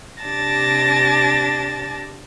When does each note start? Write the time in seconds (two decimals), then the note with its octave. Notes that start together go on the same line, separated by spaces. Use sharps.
0.22 C3 D4 G4 A5 A6 A#6